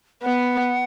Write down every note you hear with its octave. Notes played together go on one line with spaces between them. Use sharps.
B3 F#5